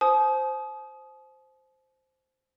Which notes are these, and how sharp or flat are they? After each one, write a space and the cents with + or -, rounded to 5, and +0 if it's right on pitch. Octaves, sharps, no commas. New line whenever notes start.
C5 +0 A5 -45 D#6 +0